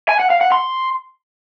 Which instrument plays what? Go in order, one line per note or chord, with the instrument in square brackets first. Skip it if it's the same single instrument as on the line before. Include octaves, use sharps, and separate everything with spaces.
[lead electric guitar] G#5
F#5
F5
F#5
C6